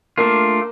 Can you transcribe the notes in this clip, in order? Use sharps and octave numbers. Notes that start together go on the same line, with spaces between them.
A3 A#3 D4 F4